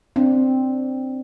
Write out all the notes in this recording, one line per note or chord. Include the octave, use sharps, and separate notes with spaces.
C4 D4